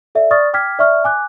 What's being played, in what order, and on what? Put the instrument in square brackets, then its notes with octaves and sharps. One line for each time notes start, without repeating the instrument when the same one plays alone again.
[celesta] A4 D5 E5
D5 C#6 D#6 F6 A6
G5 D6 F6 G#6 B6
D5 E5 C#6 F6
G#5 D6 F#6